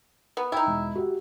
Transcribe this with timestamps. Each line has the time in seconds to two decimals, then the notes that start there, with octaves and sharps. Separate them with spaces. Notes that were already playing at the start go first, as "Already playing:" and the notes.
0.37 B3
0.52 D#4 E4 G5
0.67 E1
0.96 F#4 G4